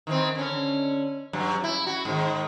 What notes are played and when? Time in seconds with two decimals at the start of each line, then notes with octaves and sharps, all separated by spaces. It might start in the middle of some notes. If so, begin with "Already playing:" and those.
0.07 D#3 E3 C4
0.35 D3 C#4
1.33 G2 F#3
1.64 E4
1.87 F#4
2.05 G#2 D#3